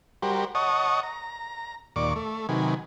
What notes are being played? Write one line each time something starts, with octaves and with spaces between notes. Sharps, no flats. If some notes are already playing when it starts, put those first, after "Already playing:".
G3 F#4 G4 A#4 C5
C#5 D#5 F#5 A5 C#6 D#6
A#5
D#2 A#2 D5 C#6 D6
A3
C3 D#3 F#3 B4 G#5